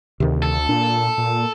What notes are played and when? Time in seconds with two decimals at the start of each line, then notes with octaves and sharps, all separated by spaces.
0.20 D2 C3 D#3
0.42 A4
0.69 A#2 D4
1.18 A#2